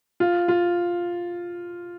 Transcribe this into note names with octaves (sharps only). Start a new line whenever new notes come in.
F4
F4